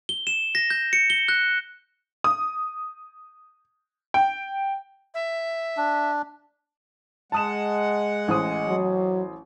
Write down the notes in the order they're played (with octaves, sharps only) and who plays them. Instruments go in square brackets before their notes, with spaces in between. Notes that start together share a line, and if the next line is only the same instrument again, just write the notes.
[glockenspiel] G7
E7
A#6
G6
C#7
G7
F#6
[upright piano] D#6
G5
[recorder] E5
[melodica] D4
[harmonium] G#3 F#5 [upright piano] A5 D#6 E7
[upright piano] A1 C5 D#6
[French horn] F#3